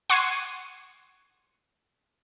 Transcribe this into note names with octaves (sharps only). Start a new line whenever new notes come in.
F#5 C6 C#6 G#6 C7 D#7